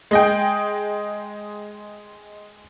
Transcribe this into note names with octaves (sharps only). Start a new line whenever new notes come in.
G#3 D#5 G5